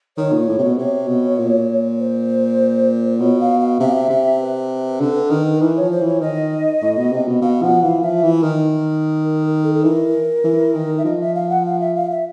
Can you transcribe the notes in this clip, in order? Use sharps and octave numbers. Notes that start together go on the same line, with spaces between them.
D#3 C#5
A#2
A2
C3
B2
C3 C#5
B2
A#2
C5
B2 C#5
F5
F5
C3 E5
F5
E5
C3
B4
D3
D#3
A#4
E3 B4
C#5
F3
C5
E3
C#5
D#3 D#5
A2
B2
C3
B2
B2 F5
F3 F#5
E3 F5
F3 E5
E3
D#3
A#4
A4
A4
E3 A#4
E3
D#3
E5
F3 D#5
E5
F5
F#5
F5
E5
F5
E5